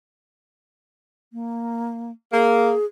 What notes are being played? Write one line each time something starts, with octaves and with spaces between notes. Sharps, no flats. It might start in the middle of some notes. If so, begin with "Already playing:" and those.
A#3
A#3 G#4